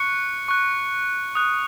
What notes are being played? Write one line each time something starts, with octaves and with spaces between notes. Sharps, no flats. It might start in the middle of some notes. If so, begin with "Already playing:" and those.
Already playing: C#6 F#6 C#7
C#6 F#6
D#6 F#6